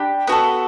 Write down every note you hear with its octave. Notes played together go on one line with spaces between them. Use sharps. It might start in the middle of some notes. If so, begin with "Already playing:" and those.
Already playing: D4 G4 G5 B5
B3 F#4 A4